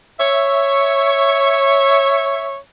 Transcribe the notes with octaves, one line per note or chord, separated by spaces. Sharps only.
C#5 E5